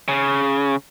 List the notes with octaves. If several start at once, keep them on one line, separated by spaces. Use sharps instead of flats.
C#3